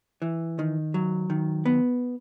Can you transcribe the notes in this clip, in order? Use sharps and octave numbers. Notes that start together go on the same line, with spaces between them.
E3
D#3
F#3
D#3
B3